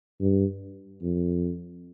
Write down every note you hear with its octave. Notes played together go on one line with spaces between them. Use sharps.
G2
F2